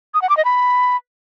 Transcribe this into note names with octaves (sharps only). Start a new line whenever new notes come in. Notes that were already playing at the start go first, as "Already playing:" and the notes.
D#6
F#5
D6
D#5
B5